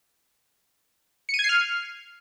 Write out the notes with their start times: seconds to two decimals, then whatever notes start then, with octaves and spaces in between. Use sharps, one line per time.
1.29 C#7
1.34 D#7
1.39 G#6
1.44 C7
1.49 F6